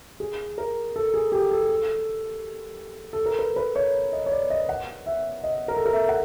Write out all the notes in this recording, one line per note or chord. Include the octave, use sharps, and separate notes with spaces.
G#4
A#4
A4
G#4
G4
A4
A4
A#4
B4
B4
C#5
D#5
C#5
D5
D#5
F#5
E5
D#5
A#4
A4
A#4
E5
F#5